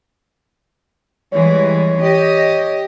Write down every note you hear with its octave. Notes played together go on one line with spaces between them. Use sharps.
E3 G3 G#3 C#5
G4 D#5